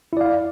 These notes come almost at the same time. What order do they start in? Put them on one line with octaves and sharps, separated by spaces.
E4 D5 F5